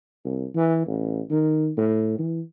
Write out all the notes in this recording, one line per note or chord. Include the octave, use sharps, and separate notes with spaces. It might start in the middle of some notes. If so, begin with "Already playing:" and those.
C2
E3
A1
D#3
A2
E3